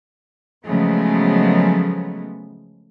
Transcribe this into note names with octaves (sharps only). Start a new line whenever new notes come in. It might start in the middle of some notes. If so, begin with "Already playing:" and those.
C#3 F3 F#3 G#3 A3 B3